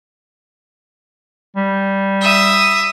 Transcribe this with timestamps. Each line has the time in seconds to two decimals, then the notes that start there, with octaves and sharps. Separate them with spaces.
1.56 G3
2.21 E5 D#6